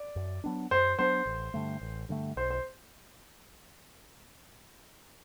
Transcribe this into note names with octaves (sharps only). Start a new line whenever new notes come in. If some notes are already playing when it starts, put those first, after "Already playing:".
Already playing: D5
F#2
F#3 B3 D4
F#2 C5
F#3 B3 D4 C5
A1
G2 D3 A3
A1
G2 D3 A3
B1 C5
C5